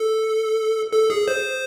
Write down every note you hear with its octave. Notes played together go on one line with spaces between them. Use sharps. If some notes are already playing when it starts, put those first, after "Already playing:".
Already playing: A4
A4
G#4
C5